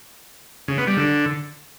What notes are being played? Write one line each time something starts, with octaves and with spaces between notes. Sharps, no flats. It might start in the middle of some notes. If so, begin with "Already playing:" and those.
C#3
B3
G3
D3